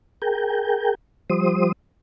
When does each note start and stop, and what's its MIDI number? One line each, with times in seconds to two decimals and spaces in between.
0.22 0.95 68
0.22 0.95 70
0.22 0.95 79
1.30 1.72 53
1.30 1.72 55
1.30 1.72 72
1.30 1.72 87